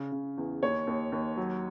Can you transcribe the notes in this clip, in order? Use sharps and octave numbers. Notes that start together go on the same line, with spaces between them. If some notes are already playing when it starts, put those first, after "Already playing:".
Already playing: C#3
C#3
E2
D#2 C#5
D#2
D#2
F#3